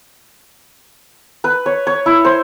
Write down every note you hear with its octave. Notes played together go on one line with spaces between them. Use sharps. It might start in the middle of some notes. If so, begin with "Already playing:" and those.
B4
C#5
C#5
E4
C5